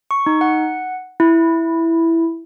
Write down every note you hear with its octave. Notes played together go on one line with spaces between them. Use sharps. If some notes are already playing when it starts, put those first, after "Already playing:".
C#6
D#4
F#5
E4